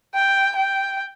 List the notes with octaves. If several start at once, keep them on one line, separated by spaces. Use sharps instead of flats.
G5
G5